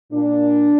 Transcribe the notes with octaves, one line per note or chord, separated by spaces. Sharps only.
A#2 D4